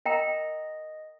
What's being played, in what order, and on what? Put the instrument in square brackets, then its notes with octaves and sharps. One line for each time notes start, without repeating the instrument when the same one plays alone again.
[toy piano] A#4 G5 A#5 [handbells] D#5